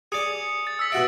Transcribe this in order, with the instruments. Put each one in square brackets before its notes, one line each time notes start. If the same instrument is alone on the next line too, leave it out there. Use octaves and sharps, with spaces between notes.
[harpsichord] G#4 D5 [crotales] D#6 C#7
[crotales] A6
E6 B6
[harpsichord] B2 F#4 E5 [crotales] A6 A#6 D7